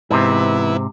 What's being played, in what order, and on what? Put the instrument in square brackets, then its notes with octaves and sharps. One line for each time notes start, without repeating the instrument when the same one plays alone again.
[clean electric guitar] G#2 C3 [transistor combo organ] E3 B3 E4